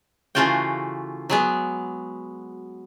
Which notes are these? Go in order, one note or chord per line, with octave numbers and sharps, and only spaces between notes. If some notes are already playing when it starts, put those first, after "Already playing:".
C#3 E3 A3 F4 F#4 G5
F#3 G#3 B3